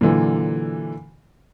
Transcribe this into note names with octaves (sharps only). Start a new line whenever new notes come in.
A#2 D3 E3 F#3